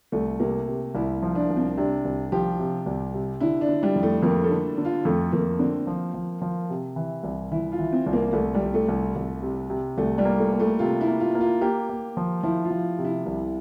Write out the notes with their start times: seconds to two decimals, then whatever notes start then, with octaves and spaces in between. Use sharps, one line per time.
0.12 C2 A3
0.40 C3 A#3
0.68 C3
0.95 C2 E4
1.23 F3
1.35 D4
1.49 C2
1.57 C4
1.77 C3 D4
2.05 C2
2.32 F3 G4
2.59 C3
2.86 C2
3.14 C3
3.40 D3 E4
3.61 D4
3.69 D3
3.83 G3
3.96 F2
4.03 A3
4.23 F2 A#3
4.44 A4
4.50 D3
4.78 D3
4.85 F4
5.05 F2 A3
5.33 F2 A#3
5.59 D3 C4
5.87 F3
6.14 F3
6.42 F3
6.70 C3
6.96 E3
7.23 C2
7.52 E3 E4
7.72 F4
7.79 E3
7.92 C4
8.07 C2
8.13 A#3
8.33 C2 A3
8.54 G3
8.61 C2
8.74 A3
8.88 C2
9.16 C2
9.43 C3
9.70 C3
9.98 C2 A3
10.18 G3
10.25 A#3
10.38 A3
10.53 A#3
10.60 A3
10.79 C3 F4
11.01 E4
11.07 A#3
11.20 F4
11.35 A#3
11.41 F4
11.61 A#3 G4
11.89 A#3
12.17 F3
12.43 F3 E4
12.65 F4
12.71 F3
12.99 C3
13.05 E4
13.26 C2